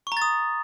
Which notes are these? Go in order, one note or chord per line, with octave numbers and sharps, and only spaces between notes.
A#5 C#6 D#6 A6